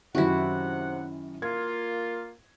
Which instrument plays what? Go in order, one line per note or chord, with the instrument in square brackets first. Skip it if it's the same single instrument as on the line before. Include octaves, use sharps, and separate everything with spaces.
[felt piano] F#2 D#3 C#4 [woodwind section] C3 F#5 [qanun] E4 F#4
[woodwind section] A#3 F4 [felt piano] G#6